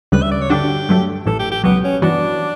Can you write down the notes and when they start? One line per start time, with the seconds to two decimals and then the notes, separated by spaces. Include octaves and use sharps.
0.12 D2 C#3 G3 B4
0.22 E5
0.31 D5
0.41 C#5
0.50 G2 D3 G3 D4 F#4 G4
0.89 G2 F#3 A3
1.26 A1 A2 E3 A4
1.39 G4
1.51 G4
1.64 C#2 B2 F#3 B3
1.84 C#4
2.02 G2 E3 B3 D4 F#4